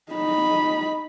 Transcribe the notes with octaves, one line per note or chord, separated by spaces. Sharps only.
D#4 B5